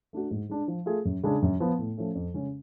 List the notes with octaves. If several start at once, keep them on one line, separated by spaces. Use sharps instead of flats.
A3 D4 F#4
G#2
G#3 D4
F3
A3 F4 G#4
F#2
C#3 G#3 D4 G#4
F#2
F3 B3
A2
F3 A3 C#4
F2
C#3 G#3 C#4